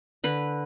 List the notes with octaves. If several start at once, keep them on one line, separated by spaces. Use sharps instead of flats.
D3 B4